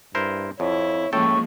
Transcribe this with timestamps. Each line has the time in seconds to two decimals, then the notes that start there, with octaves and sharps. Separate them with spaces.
0.15 G2 E4 A#4 C5
0.60 F2 E4 C#5
1.13 A2 F3 G#3 A#3 C#4 A4 G5 C#6